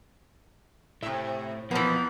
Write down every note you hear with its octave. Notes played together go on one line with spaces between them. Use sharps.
A2 C3 E5
F2 E3 F3 A#3 B3